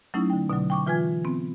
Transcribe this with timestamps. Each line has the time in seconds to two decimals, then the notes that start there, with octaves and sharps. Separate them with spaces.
0.14 F#3 A3 C#4 D#4 E4
0.30 D3 G5
0.50 B2 D3 F#3
0.70 G5 C#6 D6
0.87 E3 F4 B4 G#5 G#6
1.25 B3 C4